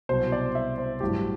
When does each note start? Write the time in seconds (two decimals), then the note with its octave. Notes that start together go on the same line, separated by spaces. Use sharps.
0.09 C2 B2 F#3 C5
0.32 D5
0.55 E5
0.78 C5
1.00 A1 G2 F#3 G4